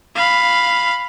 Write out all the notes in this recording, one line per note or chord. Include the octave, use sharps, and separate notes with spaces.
F5 B5